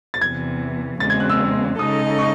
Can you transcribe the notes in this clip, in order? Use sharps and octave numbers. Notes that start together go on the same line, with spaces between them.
A6
E2 C3 E3 G#6
E2 C#3 G#3 C4 A6
G#6
F#6
E6
C#3 G#3 D#4 A4 D#5 D#6
C#6